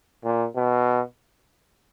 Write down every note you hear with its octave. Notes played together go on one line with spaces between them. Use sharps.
A#2
B2